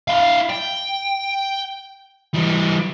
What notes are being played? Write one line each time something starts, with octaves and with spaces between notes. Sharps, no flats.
E4 F5
G5
E3 G3